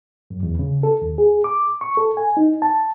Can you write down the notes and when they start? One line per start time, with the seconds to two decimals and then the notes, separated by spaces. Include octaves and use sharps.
0.30 F#2
0.43 E2
0.59 C#3
0.83 A4
1.02 D#2
1.18 G#4
1.44 D6
1.81 C#6
1.97 A4
2.17 G#5
2.37 D#4
2.62 A5